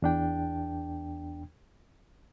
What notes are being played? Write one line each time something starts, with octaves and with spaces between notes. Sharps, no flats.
E2 D4 G5